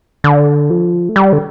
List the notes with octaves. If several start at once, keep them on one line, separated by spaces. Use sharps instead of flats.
D3
F3
A3
G3
D3